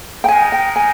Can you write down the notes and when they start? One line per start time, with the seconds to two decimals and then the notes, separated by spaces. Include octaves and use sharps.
0.24 G5
0.28 G#3 D#4 A#4 G#5
0.52 G5
0.76 G#5